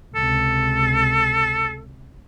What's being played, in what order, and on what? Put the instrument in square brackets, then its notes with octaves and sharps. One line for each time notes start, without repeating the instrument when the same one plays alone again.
[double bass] C#2 C3 [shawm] A4